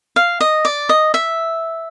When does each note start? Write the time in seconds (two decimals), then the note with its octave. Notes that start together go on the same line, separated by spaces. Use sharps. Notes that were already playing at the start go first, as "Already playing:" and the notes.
0.16 F5
0.41 D#5
0.65 D5
0.89 D#5
1.14 E5